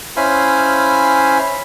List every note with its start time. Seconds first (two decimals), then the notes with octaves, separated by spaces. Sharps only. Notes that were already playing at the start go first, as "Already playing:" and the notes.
0.17 C#4 E4 C5 F5 G#5 B5